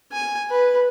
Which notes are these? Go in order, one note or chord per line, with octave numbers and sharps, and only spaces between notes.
G#5
B4